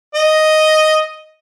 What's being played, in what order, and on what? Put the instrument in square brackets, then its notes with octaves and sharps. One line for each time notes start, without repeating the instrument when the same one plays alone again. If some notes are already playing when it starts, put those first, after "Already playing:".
[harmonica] D#5